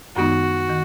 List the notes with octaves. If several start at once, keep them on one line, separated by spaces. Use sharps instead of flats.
F#2 D#3 G#3 B3 D#4 F#4
D#3